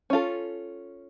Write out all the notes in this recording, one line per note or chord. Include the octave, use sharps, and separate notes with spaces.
C#4 F4 A4